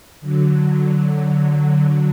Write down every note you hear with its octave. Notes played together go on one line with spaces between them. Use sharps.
D3 F#3